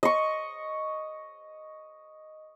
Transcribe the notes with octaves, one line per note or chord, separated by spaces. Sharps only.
D#5 C#6